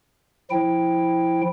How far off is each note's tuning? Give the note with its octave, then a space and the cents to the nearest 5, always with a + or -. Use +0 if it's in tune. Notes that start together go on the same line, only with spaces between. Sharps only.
F3 +0 E4 +0 G5 +0